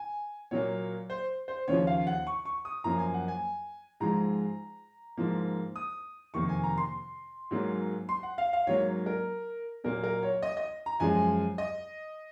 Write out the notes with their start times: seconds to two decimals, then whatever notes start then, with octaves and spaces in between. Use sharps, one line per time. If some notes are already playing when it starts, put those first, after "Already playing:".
Already playing: G#5
0.51 A#2 F#3 A#3 C#5
1.10 C5
1.48 C5
1.68 D#2 C#3 F3 C#5
1.87 F5
2.07 F#5
2.27 C#6
2.45 C#6
2.65 D#6
2.84 F#2 F3 A#3 A#5
2.98 G#5
3.14 F#5
3.28 G#5
4.00 G#2 F3 G#3 A#5
5.18 G#2 F3 A#3
5.76 D#6
6.34 F2 C3 D#3 A#3 C#6
6.49 G#5
6.64 A#5
6.78 C6
7.51 G#2 F#3 A#3
8.09 C6
8.23 F#5
8.38 F5
8.53 F5
8.67 G#2 F#3 A#3 C#5
9.06 A#4
9.84 A#2 F#3 A#3 A#4
10.04 A#4
10.23 C#5
10.42 D#5
10.57 D#5
10.86 A#5
11.00 F#2 F3 G#3 G#5
11.58 D#5